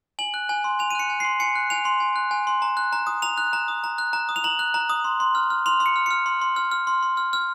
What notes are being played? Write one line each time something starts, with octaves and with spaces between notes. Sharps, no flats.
G#5 F#7
F#6
G#5
C6
G#5 F7
D#7
F#6 C#7
G#5
C7
C6
G#5 C#7
F#6
G#5 F7
C6
G#5
F#6
G#5
C6
A#5
F#6
A#5
D#6
A#5 F7
F#6
A#5
D#6
A#5
F#6
A#5
D#6
F7
A#5 F#7
F#6
A#5
D#6
C6
C6
F6
F6
C6 F7
C6
C#7
F6
F6 C#7
C6
C6
F6
F6
C6
C6
F6
F6